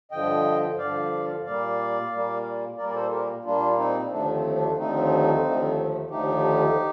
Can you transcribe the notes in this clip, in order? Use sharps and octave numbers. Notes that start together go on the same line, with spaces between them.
G2 D3 F3 D#5 G5
G2 D3 F3 D5 F5
A#2 G3 A#3 D5 F5
A#2 G3 A#3
A#2 G3 A#3 A#4 D5
D5
A4 C5
G4 A#4
A#2 G3 A#3 D4 F4
C4 D#4
D#2 D3 F3 A3 D4
C4
D4
D#2 D3 F3 A3 C4 D#4
D#2 D3 F3 A3
D#2 D3 F3 A3 D#4 G4